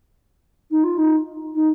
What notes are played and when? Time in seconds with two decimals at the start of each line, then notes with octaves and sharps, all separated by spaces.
0.71 D#4
0.84 F4
0.98 D#4
1.55 D#4